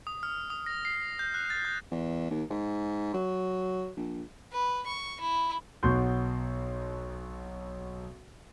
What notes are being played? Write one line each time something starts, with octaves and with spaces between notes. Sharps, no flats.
D#6
F6
D#6
A#6
C7
G6
F#6
A6
G6
E2
D#2
G#2
F#3
A#1
B4
C#6
E4
B1 B2 F#4 C6 G6